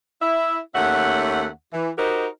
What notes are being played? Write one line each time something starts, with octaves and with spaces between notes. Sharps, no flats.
E4 E5
D#2 A3 C#4 E5 F#5
E3
D#4 F#4 G4 A#4 C5 D#5